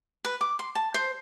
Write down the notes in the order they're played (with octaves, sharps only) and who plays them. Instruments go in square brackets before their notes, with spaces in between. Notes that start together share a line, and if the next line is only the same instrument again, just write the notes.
[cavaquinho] B4
D6
C6
A5
C5